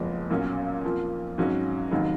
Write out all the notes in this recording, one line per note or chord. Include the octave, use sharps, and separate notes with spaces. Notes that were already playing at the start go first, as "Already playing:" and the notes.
Already playing: F#1 F2 F3 G#3 B3
B1 A#2 F#3 C#4
F2 F3 A#3 F4
G#1 G#2 F#3 C#4 F#4
F1 D#2 D#3 F#3